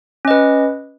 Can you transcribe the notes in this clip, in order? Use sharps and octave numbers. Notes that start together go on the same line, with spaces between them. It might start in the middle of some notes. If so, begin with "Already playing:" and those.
C#4 B4 D#5